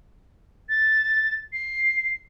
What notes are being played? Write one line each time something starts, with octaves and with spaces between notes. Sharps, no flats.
A6
C7